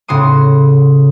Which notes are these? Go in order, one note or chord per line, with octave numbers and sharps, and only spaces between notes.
A2 C#3 F#4 C6 D#6